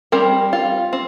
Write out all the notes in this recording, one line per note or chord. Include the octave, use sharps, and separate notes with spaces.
G3 C4 A#4
F4
C4